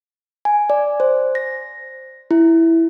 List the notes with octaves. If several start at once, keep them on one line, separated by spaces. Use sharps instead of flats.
G#5
D5
C5
A#6
E4